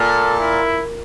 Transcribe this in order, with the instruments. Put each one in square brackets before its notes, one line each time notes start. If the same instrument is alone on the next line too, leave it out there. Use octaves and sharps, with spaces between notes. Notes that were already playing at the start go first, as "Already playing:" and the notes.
Already playing: [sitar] A#2 [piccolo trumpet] A4
[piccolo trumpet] E4